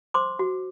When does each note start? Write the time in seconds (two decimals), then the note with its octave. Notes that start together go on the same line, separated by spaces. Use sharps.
0.14 C5 C6 D6
0.39 F#4